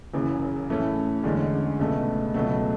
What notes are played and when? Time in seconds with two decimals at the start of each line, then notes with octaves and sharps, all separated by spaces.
0.14 F#1 F#2 C#3 E3
0.69 A2 E3 A3 C#4
1.24 E2 D3 G#3 C#4
1.79 C#2 B2 A3
2.34 C#2 B2 F#3 A3